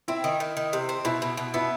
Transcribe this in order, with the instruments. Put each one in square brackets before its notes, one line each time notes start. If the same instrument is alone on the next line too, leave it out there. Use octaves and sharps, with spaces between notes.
[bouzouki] C4 [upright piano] E4 E5
[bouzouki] D#3
D#3
D#3
C3
C4
[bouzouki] B2 [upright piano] E4 E5
[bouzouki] B2
B2
[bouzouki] B3 [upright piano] E4 E5